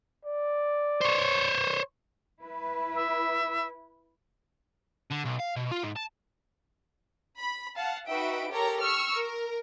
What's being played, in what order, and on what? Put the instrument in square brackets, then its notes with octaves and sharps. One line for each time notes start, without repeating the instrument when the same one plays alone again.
[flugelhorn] D5
[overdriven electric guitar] C5 C#5
[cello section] E4 B4
[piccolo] E5
[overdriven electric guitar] D3
B1
F5
B2
F4
G#2
A5
[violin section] B5
F5 F#5 A5
D#4 F#4 B4 E5 G5 D7
G4 A4 A#4 C#5 A#5
C#6 E6 F6 C#7
A#4